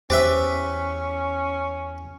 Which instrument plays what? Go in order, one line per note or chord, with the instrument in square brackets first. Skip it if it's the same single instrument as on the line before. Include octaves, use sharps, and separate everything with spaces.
[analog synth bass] E2 [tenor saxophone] C#4 [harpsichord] G4 B4 E5 [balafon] C5